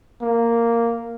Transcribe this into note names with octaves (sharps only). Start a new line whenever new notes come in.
A#3